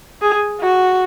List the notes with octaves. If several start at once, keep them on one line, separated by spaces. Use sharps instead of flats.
G#4
F#4